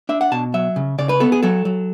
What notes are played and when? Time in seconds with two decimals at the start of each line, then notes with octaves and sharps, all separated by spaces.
0.09 D4 E5
0.21 F#5
0.32 B2 A5
0.54 F#3 E5
0.76 C#3
0.98 C#3 D5
1.09 B4
1.20 B3 A4
1.32 G#4
1.43 F#3 A4
1.65 F#3